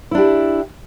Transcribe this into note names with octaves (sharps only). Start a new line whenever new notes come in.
D4 E4 G4